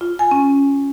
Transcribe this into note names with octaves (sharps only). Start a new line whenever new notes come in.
F4
G#5
C#4